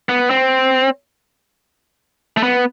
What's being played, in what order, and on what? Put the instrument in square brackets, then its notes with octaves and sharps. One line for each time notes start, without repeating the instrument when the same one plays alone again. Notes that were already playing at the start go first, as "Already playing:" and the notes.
[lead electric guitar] B3
C4
A3
B3